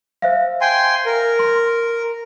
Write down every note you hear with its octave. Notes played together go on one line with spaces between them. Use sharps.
C5 E5 F5
G5 G#5 C6
A#4
C6